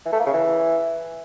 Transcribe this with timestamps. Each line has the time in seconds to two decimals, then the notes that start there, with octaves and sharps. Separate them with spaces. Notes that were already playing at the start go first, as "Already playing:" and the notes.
0.06 E3
0.13 A3
0.20 A#3
0.27 C#3
0.33 E3